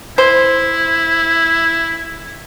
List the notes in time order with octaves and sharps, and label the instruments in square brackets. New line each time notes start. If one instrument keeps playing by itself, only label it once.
[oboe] E4 [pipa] C5